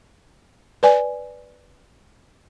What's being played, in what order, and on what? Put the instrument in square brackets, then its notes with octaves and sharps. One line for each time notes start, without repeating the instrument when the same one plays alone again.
[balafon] B4 D5 G#5